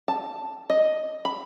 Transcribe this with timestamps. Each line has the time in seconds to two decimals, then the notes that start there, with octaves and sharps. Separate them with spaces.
0.08 A5
0.70 D#5
1.25 B5